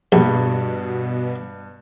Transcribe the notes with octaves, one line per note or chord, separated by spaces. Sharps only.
A#1 G2 B2